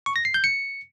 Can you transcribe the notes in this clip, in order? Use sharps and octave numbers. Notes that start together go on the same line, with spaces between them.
C#6
A#6
C7
G6
C#7